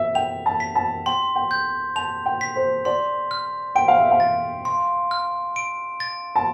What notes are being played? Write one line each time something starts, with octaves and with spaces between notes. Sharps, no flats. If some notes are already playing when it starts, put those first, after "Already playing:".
Already playing: E5
G5 F7
A5
B6
A5
G5 C6
G5
G6
A5 F7
G5
B6
C5
D5 C6
F6
G5 D7
F5
E5
F5
A6
C6
F6
D7
A6
A5